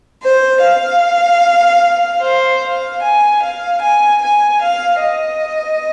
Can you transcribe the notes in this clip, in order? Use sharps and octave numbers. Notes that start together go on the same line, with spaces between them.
C5
F5
C5
F5
G#5
F5
G#5
G#5
F5
D#5